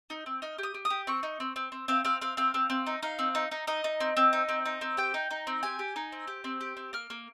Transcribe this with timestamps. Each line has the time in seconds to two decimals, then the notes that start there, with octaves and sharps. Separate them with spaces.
0.10 D#4
0.26 C4
0.42 D#4 F6
0.58 G4 D#6
0.74 G4
0.85 D#6
0.90 G4
1.07 C4 C#6
1.23 D#4
1.40 C4
1.56 C4
1.72 C4
1.88 C4 F5
2.05 C4 F5
2.21 C4 F5
2.37 C4 F5
2.54 C4
2.70 C4
2.86 D#4
3.03 D#4 F5
3.19 C4
3.35 D#4
3.51 D#4
3.67 D#4 D#5
3.84 D#4
4.00 C4
4.17 C4
4.33 D#4
4.49 C4
4.65 D#4
4.81 C4
4.97 G4 G5
5.14 D#4
5.31 D#4
5.47 C4
5.63 G4 G#5
5.79 G4
5.96 D#4
6.12 C4
6.27 G4
6.44 C4
6.61 G4
6.77 C4
6.93 A#3 F6
7.10 A#3